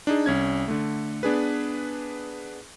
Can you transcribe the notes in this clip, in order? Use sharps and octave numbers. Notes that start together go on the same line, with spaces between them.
D4 D#4 G#4
C2 C#4 G#6
D3 A3
B3 D4 G#4 B4